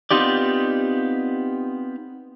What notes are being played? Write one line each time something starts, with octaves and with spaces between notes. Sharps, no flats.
B3 C4 D#4 F4 G4 D5